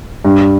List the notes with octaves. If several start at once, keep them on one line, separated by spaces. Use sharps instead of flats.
G2